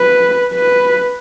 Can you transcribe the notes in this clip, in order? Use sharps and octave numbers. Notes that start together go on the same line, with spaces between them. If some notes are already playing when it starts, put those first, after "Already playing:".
Already playing: B4
B4